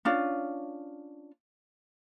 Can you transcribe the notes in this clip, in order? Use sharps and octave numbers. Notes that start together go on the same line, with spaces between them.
C#4 D4 F4